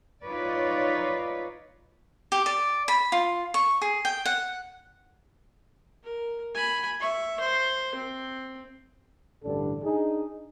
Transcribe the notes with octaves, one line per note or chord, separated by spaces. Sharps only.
D#4 F4 B4 C#5 D5
G4
D5
B5
F4
C#6
G#4
G5
F#5
A#4
G#5 B5
E5 C#6
C5
C4
A1 G2 D3 D4 A4
D4 D#4 G#4